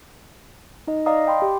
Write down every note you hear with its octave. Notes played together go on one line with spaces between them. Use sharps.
D#4 D#5
D5 D#5 F5 A#5 D#6
G5 B5 C6
G4